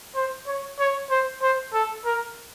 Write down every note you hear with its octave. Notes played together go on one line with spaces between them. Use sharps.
C5
C#5
C#5
C5
C5
A4
A#4